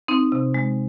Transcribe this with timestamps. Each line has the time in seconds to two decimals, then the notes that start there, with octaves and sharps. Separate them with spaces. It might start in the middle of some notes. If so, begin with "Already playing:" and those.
0.08 C4 D#4
0.32 C3
0.54 G#3